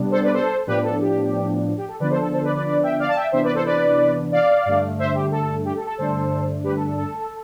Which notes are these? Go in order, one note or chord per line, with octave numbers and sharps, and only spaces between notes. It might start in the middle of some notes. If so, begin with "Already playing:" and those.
Already playing: C3 G3 B3 D4
A4 C5
B4 D5
A4 C5
A2 F3 B3 D4 G4 B4
A4
G4
G4
A4
D3 F3 B3 D4 B4 D5
A4 C5
A4
A4 C5
B4 D5
B4 D5
B4 D5
E5 G5
D5 F5
A5
E5 G5
C3 E3 B3 D4 C5 E5
B4 D5
A4 C5
B4 D5
D5 F5
G2 D3 A3
C5 E5
G4
A4
G4
A4
A4
G2 D3 A3 D4 A4 C5
G4 B4
A4
A4
A4